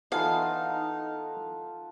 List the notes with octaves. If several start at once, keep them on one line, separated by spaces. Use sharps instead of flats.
E3 B3 D#4 F4 A4 F5 F#5